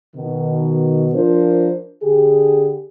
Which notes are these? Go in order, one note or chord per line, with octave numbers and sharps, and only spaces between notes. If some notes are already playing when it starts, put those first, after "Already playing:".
B2 D#3
F3 D4 F4 A#4 C5
D3 G4 G#4